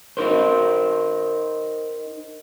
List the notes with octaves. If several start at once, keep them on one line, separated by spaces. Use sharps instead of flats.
D#4 A#4 C5